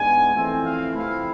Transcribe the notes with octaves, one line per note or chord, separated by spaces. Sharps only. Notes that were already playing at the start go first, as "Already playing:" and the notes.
Already playing: G#2 G#3 B3 D4 G#5
F2 E3 A3 C4
F5
C3 F3 A3 C4 E4 F5